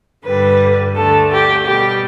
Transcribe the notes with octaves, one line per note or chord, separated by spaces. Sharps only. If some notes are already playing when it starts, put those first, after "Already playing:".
G2 D3 G3 B4
D2 D3 A3 A4
G4
B2 G3 G4